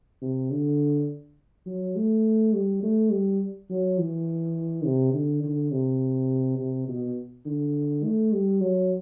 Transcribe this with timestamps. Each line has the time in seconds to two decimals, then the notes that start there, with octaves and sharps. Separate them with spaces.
0.22 C3
0.51 D3
1.66 F#3
1.96 A3
2.53 G3
2.83 A3
3.11 G3
3.70 F#3
3.98 E3
4.85 C3
5.14 D3
5.44 D3
5.72 C3
6.59 C3
6.88 B2
7.45 D3
8.03 A3
8.33 G3
8.61 F#3